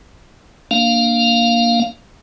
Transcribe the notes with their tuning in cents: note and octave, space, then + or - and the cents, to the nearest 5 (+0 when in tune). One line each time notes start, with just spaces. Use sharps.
A#3 +0 D4 +0 F5 +0